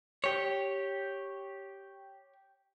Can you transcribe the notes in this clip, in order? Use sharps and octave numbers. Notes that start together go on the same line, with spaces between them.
G4 C#5